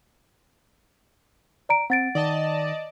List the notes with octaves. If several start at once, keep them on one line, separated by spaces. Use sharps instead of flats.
D5 A#5 D7
C4 F#5 A6 D7
D#3 D5 D#5 A5